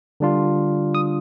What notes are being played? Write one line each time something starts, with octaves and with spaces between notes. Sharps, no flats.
D3 G3 D4 F4
D#6